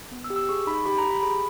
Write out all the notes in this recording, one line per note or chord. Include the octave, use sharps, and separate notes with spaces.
B3
E6
G4
E6
G#4 C#6
D#4 B5
G4 B5
A#5
G4
B5
G#4 B5